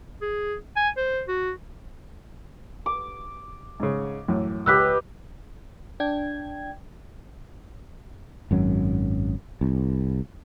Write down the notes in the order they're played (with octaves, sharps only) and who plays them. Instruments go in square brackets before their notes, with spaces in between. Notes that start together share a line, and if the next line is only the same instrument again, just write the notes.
[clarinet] G#4
G#5
C5
F#4
[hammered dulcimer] D6
[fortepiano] G#2 C#3
F#2 A2 E3
[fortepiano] C#2 [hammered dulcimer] G4 B4 D#5 [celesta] E6 F#6 B6
[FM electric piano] D4 G5 G#6
[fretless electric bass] G#1 F#2 F#3
C2